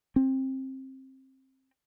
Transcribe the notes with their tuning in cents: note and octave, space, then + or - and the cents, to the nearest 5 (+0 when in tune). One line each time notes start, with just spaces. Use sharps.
C4 +20